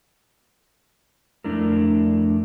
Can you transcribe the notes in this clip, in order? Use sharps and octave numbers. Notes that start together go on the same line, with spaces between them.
F2 A3 D4 E4 A#4